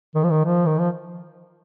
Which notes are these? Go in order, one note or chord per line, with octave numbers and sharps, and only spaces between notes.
D#3
F3
D#3
F3
D#3
F3